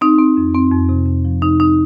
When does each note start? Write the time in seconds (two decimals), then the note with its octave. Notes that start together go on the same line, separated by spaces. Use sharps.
0.01 C4 D#4
0.18 C4
0.37 F2
0.54 C4
0.72 F2
0.89 C3
1.06 F2
1.25 F3
1.42 C3 D#4
1.60 C4 D#4